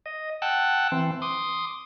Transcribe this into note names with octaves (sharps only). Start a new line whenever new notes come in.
D#5
F#5 G5 A5 E6 F#6
E3 C4
C6 D6 D#6